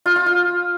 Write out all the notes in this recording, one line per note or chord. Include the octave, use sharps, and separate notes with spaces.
F4
F4
F4